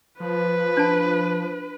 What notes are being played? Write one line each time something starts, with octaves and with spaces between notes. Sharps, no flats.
F3 B4
D4 A5